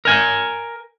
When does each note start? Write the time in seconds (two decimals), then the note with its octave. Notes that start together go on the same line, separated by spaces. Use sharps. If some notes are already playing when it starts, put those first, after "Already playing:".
0.05 A#4 G#5